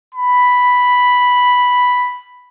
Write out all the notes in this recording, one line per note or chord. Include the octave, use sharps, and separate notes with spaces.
B5